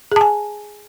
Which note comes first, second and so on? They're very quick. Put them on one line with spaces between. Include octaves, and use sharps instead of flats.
G#4 A5 G#5